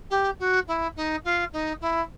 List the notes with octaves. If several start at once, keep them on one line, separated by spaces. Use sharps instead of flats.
G4
F#4
E4
D#4
F4
D#4
E4